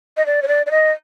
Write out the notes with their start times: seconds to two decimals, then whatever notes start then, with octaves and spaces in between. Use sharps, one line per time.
0.17 D#5
0.26 D5
0.42 C#5
0.48 D5
0.66 D5
0.71 D#5